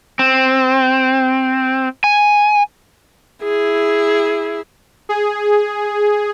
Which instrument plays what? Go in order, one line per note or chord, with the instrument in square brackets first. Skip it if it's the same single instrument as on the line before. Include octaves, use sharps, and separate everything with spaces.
[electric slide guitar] C4
G#5
[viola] E4 G#4
[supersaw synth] G#4